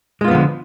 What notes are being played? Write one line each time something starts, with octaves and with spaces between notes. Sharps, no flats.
D3 F3 G#3 B3 F4